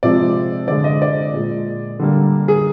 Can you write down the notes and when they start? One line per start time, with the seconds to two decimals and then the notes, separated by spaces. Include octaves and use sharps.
0.03 C3 F3 G#3 D5
0.68 D3 G#3 D5
0.84 D#5
1.02 D5
1.34 A#2 G#3
1.99 D3 G3 A#3
2.48 G#4